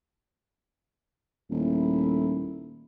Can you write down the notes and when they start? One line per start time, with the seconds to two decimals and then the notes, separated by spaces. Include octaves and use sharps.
1.50 D#1 A3 D#4 E4